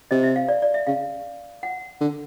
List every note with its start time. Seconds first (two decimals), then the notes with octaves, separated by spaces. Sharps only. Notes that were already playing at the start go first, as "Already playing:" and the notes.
0.11 C3 D#5
0.23 E5
0.36 F5
0.48 D5
0.62 D5
0.74 E5
0.87 C#3 F5
1.63 F#5
2.01 D3